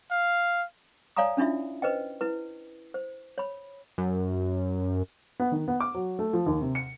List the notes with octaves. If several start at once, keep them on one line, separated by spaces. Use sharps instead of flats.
F5
C#5 D5 F5 G#5 A#5 D#6
C#4 D4 E4 F4 E5
B4 C5 D#5 G5
E4 B4
C5
C#5 B5
F#2
B3
D#3
B3
D6
F#3
A3
F3
D#2
C3
C#7